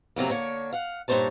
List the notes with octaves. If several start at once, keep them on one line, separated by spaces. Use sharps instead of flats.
F2 C3 F#3 A#3
D3 A#3 C#5
F5 F#5
G2 A#2 D#4 C5 C#5 A5